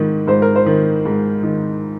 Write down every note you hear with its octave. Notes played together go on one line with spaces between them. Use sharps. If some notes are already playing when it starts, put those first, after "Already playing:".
Already playing: G#2 D#3
G#2 C5
A#4
C5
D#3
G#2
D#3